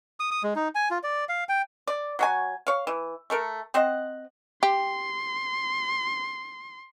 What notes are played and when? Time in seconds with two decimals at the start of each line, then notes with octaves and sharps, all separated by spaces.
0.20 D#6
0.31 D#6
0.43 G#3
0.56 D#4
0.75 G#5
0.91 F4
1.03 D5
1.29 F5
1.49 G5
1.87 D5
2.19 F#3 F#4 G#5
2.67 C#5 F5
2.87 E3
3.30 A3 A4 A#4
3.74 C4 C5 D#5 F#5
4.63 G4 C6